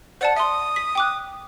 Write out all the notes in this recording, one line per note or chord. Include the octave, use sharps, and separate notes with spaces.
C5 D5 F#5 A5
E5 C6 D#6
B6
G5 D6 F#6